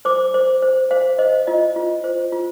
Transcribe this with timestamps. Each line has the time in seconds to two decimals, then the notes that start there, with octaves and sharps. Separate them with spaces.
0.05 C5 D6
0.34 C5
0.62 C5
0.91 C5 F5
1.19 C5 D#5
1.47 F4 D#5
1.76 F4
2.04 C5
2.32 F4